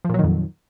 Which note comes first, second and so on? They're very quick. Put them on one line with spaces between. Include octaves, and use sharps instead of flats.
F3 A#2 F#3 D#3 F2